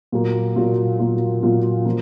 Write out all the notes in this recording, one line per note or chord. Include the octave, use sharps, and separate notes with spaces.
A#2 F#3 A#3 F4
A#2 F#3 A#3 F4
A#2 F#3 A#3 F4
A#2 F#3 A#3 F4
F3 A#3